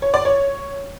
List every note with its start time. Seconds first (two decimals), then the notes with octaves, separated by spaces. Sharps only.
0.02 C#5
0.14 D5
0.25 C#5